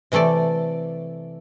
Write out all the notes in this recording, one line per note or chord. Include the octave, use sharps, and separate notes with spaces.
C3 E3 A3 A4 D5